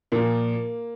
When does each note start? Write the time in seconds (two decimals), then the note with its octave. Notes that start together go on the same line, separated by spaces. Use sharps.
0.12 A#2 F3 A#3